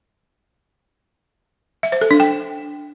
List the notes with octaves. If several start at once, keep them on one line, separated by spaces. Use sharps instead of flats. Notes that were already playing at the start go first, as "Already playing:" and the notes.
E5
C5
A4
D4
G5